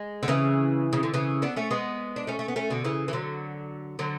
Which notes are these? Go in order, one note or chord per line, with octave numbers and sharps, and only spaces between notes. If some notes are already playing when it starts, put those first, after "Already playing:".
Already playing: G#3
D3
C#3 E3
C#3
D3
C#3 E3
B3 D4
A3 C#4
G#3 B3
D4
A3 C#4
A3
B3
A3 C#4
B2 D3
C#3 E3
E3
D3 F#3
D3 F#3